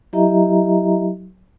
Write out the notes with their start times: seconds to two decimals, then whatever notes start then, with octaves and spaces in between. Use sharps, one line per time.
0.13 F#3 E4 G4 D#5 E5 A#5